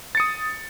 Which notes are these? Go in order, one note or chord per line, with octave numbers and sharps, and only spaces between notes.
D#6 A6 C#7